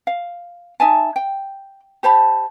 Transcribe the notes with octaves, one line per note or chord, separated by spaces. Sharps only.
F5
D#4 E5 G#5 A5
G5
G4 C5 A5 B5